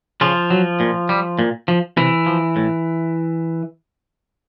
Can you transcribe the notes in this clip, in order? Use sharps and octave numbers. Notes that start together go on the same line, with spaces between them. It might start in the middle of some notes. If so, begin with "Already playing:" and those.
C#3 F3 F4
F#3
A#2
G3
A#2
F3
C3 E3 E4
F3
A2